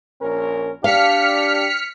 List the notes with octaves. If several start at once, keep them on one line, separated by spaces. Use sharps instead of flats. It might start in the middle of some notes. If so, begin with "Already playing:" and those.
A#1 C#4 A#4
D4 G4 F5 F6 B6 C#7